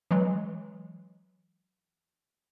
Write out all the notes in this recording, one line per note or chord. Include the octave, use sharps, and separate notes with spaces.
E3 F#3 G#3